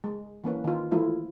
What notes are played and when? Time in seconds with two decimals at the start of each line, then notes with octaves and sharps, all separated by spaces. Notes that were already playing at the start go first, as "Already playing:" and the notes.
0.04 G#3
0.44 E3 A#3 C#4 B4
0.64 D#3 F4
0.91 E3 F3 G#3 A3 E4 F4